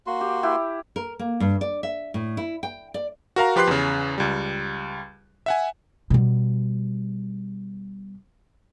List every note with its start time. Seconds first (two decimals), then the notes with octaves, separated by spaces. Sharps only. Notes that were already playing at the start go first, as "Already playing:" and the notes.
0.07 A#3 F#4 C6
0.21 G4
0.43 E4 G4 F#5
0.96 A#4
1.19 A#3
1.40 G2
1.61 D5
1.83 E5
2.14 A2
2.37 E4
2.63 G5
2.94 D5
3.36 F#4 A#4 F5 A#5
3.56 F3 G4 B4 C6 F#6 C7
3.67 E2 C#3
4.18 C#2 G3
5.46 E5 F#5 G#5
6.10 B2 G3